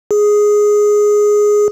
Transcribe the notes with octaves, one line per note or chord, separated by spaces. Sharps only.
G#4